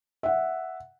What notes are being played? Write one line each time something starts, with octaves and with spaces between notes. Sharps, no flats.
E5 F#5